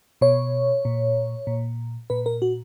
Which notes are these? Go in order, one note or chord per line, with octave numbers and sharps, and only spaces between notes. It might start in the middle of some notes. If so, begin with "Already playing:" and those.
B2 C#5
A#2
A#2
A#2 B4
A#4
F#4